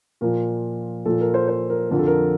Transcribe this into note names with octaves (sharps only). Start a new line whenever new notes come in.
A#2 F3 A#4
A#2 F3 A4
A#4
C5
C5
A#4
F2 D3 F3 A#4
A4
A#4